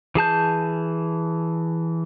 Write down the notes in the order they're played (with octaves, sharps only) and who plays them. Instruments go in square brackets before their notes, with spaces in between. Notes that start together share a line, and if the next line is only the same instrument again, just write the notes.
[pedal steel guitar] E3 G#4 A5 G6